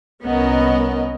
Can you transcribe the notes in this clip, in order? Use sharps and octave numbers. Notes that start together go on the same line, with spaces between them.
C2 B3 C#4 A#4 D#5